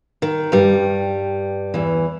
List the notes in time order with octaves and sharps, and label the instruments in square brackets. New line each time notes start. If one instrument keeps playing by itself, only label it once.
[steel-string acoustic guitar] D#3
G2 G3
E2 E3